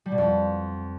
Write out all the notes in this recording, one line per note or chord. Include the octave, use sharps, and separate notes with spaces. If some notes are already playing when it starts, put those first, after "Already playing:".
G3
B2
F2